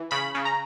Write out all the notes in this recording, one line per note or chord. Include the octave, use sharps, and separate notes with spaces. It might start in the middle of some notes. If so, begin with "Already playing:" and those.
Already playing: E3
C#3 B5
C#3
A#5